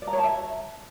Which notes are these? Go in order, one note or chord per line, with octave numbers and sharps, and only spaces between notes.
D5
A#5
C#5
A5
E5